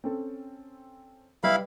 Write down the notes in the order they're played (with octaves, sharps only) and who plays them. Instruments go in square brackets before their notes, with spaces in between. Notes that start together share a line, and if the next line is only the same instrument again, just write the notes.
[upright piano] C4 C#4 A4
[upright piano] G3 B4 D#5 [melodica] E4 F5 B5